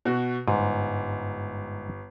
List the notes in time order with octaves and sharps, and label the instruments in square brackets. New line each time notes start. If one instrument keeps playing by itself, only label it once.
[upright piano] B2 F#4
[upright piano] G1 [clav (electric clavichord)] G#2